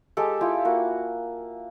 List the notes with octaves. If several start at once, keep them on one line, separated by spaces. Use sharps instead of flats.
G#3 G4 A4
E4 F4 G4
A#3 F#4